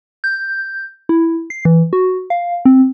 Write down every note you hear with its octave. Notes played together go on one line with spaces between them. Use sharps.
G6
E4
C7
E3
F#4
F5
C4